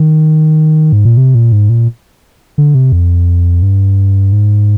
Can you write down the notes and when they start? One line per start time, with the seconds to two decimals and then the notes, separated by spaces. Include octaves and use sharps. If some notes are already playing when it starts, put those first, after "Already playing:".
Already playing: D#3
0.93 G#2
1.05 A#2
1.17 C3
1.35 A#2
1.52 G#2
1.69 A#2
2.58 D3
2.75 C3
2.92 F2
3.62 G2
4.32 G#2